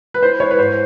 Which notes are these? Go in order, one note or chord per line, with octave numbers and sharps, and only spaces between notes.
B4
E4 C5
E4 C#5
B4
G#2 C5